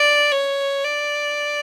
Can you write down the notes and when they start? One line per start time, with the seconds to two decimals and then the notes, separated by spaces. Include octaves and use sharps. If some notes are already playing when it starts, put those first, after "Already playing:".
Already playing: D5
0.32 C#5
0.84 D5